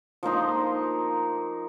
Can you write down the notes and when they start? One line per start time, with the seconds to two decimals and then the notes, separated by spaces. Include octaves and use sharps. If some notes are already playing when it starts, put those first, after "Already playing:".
0.23 F3 A#3 D#4 C6